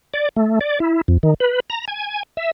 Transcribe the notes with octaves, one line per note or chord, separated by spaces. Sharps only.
D5
A3
D5
E4
F2
D#3
B4
A#5
G#5
E5